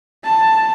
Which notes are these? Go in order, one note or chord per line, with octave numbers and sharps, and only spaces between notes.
A5